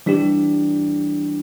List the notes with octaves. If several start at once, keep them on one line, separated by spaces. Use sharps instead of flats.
E3 G3 D4 G4